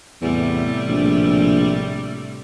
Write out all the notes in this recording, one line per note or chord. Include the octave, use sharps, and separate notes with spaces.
E2 A2 C3 G3
A#1